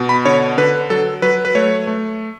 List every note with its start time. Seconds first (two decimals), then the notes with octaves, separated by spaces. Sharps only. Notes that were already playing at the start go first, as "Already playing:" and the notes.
Already playing: B2
0.09 B5
0.25 D3 C#5
0.58 D3 B4
0.90 F#3 A4
1.22 F#3 B4
1.45 B4
1.55 A3 C#5
1.87 A3